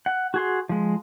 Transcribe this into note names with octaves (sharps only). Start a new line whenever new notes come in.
F#5
F#4 G#4 C6
F3 G#3